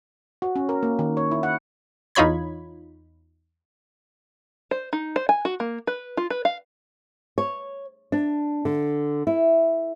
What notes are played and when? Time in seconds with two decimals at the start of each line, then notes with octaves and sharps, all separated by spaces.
0.42 F#4
0.56 C#4
0.69 A#4
0.83 A#3
0.99 D#3
1.17 C#5
1.31 E4
1.43 F#5
2.15 E2 D#4 F4 C#5 B5 G#6
4.71 C5
4.93 D#4
5.16 C5
5.29 G#5
5.45 F#4
5.60 A#3
5.87 B4
6.17 F4
6.30 B4
6.45 F5
7.38 C#5
8.12 D4
8.65 D3
9.27 E4